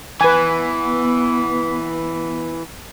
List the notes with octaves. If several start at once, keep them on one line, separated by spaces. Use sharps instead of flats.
E3 B3 B4 G#5